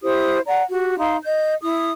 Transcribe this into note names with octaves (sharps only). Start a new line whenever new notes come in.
E4 G4 C5 D#6
D5 F#5 A#5
F#4 G4
D#4 F5 C6
D#5 G6
E4 D#6